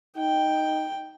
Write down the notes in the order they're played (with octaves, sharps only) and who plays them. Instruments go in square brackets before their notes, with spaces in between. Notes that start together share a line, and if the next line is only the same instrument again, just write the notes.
[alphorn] D#4 [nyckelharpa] G5